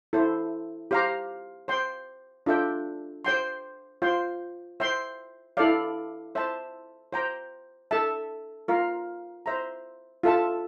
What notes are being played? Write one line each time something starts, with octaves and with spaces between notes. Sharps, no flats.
E4 A4 C5
G4 C5 F5 A#5
C5 G5 C6
D4 F4 A4 E5 G5
C5 G5 C6
F4 C5 G5 C6
C5 E5 G5 C6
E4 A4 D5 F5
C5 E5 A5
C5 G5 A#5
A4 E5 A5
F4 A#4 F5
C5 E5 A#5
F4 A4 E5 A5